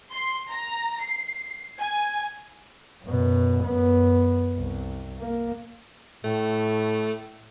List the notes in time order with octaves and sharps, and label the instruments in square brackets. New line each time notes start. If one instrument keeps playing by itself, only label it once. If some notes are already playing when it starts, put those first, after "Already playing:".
[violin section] C6
A#5
C7
G#5
[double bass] F#2 B2
F#2 B3
C2
A#3
[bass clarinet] A2 [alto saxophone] A3